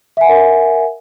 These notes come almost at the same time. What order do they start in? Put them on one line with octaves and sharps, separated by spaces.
E5 G#5 F#5 A#4